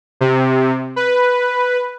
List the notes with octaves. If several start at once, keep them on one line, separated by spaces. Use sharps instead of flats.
C3
B4